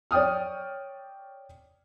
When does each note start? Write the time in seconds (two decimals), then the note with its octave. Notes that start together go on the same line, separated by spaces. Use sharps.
0.11 C#5 D5 G5 D#6 F6